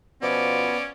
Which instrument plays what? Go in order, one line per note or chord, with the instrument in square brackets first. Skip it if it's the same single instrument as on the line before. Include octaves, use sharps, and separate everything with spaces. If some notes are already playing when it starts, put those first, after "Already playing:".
[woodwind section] B2 F3 [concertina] B3 [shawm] C#4 [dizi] D5